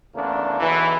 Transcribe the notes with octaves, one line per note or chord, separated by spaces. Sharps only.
E2 C#3 A3 A#3 D4
B1 E2 E3